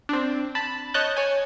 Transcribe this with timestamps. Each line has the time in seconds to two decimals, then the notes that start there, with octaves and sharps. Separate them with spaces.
0.09 C4 D4
0.55 A5 B5
0.94 C#5 D#5 A5 F#6 G6
1.17 C#5 G#5